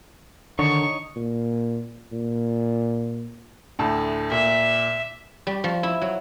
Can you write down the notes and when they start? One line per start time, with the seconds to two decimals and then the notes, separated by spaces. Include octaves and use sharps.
0.59 D3 D#3 D#4 C#5 C#6
1.16 A#2
2.12 A#2
3.79 D2 A2 A5
4.31 A#2 E5
5.47 G3
5.64 F3
5.83 E4
6.02 F#3